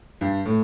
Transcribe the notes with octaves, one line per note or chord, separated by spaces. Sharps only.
G2
A2